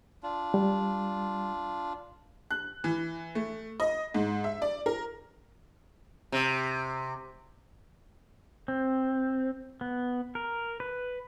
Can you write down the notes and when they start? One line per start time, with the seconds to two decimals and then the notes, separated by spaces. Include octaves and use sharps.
0.23 D4 F4
0.54 G3
2.51 F#6
2.84 E3
3.35 A3
3.80 D#5
4.14 G#2
4.44 E5
4.62 D5
4.86 A#4
6.32 C3
8.68 C4
9.81 B3
10.35 A#4
10.80 B4